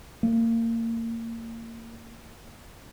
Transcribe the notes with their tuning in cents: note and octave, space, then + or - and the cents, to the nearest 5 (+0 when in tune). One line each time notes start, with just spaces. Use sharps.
A#3 -30